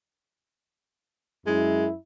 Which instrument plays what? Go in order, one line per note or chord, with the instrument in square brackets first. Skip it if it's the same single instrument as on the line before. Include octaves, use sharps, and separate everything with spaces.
[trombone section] F#2 E4 [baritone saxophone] G#3